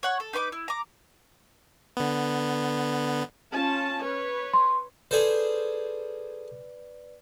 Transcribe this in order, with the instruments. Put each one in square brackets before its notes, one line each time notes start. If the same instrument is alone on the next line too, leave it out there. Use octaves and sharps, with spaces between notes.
[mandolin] C#5 F#5 C#6
A4
D#4 B4 C#6 D6
E4
A#5 D6
[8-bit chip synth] D3 B3
[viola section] C#4 F4 A5
B4 C#5
[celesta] C6
[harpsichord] G#4 A4 C5 [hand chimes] B4 D5